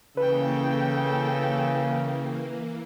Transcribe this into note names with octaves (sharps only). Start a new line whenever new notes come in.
C#3 E3 A#3 A4 B4 G5